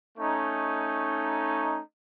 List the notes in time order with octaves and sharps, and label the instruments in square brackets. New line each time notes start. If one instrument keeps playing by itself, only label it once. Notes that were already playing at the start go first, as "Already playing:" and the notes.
[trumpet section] A3 C#4 D#4